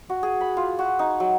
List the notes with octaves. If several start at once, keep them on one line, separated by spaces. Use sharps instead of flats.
F#4
G#4
B5
F4
F#4
D#4
F#3